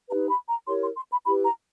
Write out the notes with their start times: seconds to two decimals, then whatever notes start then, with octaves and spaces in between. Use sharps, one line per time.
0.09 D#4 G4 B4 A#5
0.28 B5
0.48 A#5
0.67 E4 G4 A#4 C#5 C6
0.82 C6
0.96 C6
1.11 B5
1.25 E4 G4 B4 B5
1.44 A#5